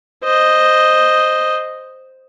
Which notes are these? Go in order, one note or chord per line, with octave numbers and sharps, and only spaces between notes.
C5 D#5